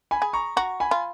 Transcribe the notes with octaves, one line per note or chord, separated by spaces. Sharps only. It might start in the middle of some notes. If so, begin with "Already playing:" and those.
G#5 B5
G#4
A#5 C#6
F#4 A#5 C#6
G#5 B5
F4